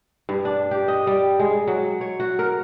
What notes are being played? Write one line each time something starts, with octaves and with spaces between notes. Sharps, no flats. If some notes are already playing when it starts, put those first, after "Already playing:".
G2
D4
G4
D#5
G3
G#3
F#3
C#5
F#4
A#4